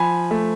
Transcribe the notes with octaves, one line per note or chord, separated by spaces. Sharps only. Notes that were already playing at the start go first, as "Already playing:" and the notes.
Already playing: F3 G#5 B5
A3